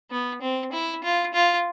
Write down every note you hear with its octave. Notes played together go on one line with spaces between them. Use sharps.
B3
C4
E4
F4
F4